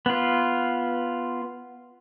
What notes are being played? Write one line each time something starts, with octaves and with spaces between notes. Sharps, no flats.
B3 F4